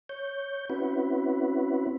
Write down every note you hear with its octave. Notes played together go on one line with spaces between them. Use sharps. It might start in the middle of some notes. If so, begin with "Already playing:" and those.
C#5 G6
C4 C#4 E4 F#4 B4